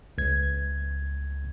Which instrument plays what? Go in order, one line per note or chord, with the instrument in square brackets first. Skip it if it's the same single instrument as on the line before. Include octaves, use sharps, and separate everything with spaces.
[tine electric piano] C#2 G#6